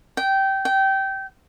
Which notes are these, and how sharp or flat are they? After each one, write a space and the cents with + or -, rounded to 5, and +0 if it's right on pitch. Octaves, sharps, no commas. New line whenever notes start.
G5 -15
G5 -20